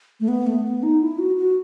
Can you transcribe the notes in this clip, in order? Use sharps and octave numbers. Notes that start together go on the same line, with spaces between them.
A3
B3
A3
B3
D#4
E4
F#4
F#4